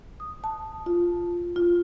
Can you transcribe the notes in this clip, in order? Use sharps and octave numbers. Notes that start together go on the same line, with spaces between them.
D#6
A5
F4
F4